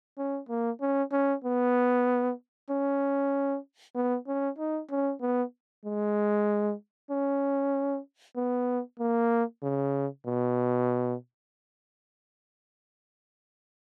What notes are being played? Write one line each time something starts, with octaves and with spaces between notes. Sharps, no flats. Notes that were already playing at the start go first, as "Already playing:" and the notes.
C#4
A#3
C#4
C#4
B3
C#4
B3
C#4
D#4
C#4
B3
G#3
C#4
B3
A#3
C#3
B2